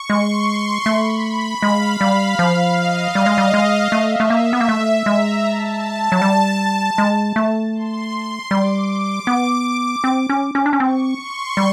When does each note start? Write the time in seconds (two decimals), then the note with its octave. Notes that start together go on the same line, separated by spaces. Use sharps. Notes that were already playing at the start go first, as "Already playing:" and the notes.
Already playing: C#6
0.09 G#3 C6
0.86 A3 B5
1.62 G#3 F5
2.01 G3
2.39 F3 F5
2.77 D#5
3.15 G3
3.26 G#3
3.38 G3
3.54 G#3
3.92 A3 E5
4.20 A3
4.30 A#3
4.53 B3
4.61 A#3
4.69 A3
5.06 G#3 A#5
5.45 A5
6.12 F#3
6.22 G3
6.98 G#3
7.36 A3
7.74 C6
8.12 C6
8.51 G3 D6
9.27 B3
10.04 C4
10.29 C#4
10.55 C#4
10.66 D4
10.73 C#4
10.80 C4 C#6
11.19 C6
11.57 G3